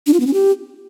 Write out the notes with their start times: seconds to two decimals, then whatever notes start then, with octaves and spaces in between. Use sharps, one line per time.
0.07 D4
0.13 F4
0.20 B3
0.27 C#4
0.34 G4